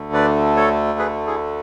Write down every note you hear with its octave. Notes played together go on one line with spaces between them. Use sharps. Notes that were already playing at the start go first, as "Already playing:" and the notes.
Already playing: D2 D3 A3
B4 D5
A4 C#5
G#4 B4
E4 G#4